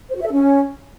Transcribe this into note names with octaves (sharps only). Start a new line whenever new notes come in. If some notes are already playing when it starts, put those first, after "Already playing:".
C5
F#4
E5
A4
C#4